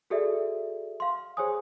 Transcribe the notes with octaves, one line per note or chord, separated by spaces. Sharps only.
F#4 G#4 A4 D5 E5
F5 C6
G#4 C5 C#5 G#5 D#6